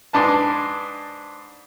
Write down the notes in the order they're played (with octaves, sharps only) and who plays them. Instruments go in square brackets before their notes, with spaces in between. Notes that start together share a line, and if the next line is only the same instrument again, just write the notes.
[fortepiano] G#2 G#3 D4 B4 A5